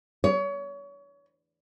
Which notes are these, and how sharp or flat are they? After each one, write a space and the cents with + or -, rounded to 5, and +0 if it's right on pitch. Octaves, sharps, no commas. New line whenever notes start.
C#5 +30